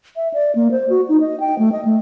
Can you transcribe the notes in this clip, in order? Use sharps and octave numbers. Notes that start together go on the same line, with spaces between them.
E5
D5
A#3
C5
F#4
D#4
D#5
G5
A3
D#5
A3